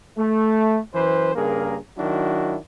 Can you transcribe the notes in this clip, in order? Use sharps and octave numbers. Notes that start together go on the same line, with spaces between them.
A3
F#2 E3 B4 C5
G2 C#3 A#3 G#4 A#4
D#3 F#3 D4 E4 F#4